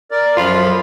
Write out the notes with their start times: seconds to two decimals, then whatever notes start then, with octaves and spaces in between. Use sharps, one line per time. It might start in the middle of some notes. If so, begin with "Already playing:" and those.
0.11 A#4 D5
0.37 F#2 F3 F4 B5